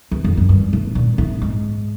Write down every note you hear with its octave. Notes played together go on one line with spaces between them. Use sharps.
E2
F2
F#2
G2
A2
A#2
A2
G#2